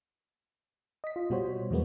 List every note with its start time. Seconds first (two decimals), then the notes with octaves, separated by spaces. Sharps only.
1.04 D#5 B6
1.16 F4
1.30 B2 G3 F#4 C5 C#5
1.71 E2 B2 F#3 G#3 A#3 B3